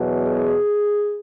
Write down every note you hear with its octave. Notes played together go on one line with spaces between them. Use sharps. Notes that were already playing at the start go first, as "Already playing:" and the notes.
Already playing: E2 B2 F#3
G#4